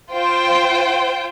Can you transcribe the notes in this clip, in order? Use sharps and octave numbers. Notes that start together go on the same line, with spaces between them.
F4 C5 G5